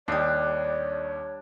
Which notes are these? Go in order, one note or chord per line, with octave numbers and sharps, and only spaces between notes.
D#2 G3 D4 C#5 D5 D#6